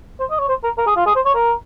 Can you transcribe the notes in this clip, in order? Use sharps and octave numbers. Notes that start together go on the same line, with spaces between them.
C5
D#5
C#5
C5
A#4
A#4
G#4
F4
G#4
C5
C#5
A#4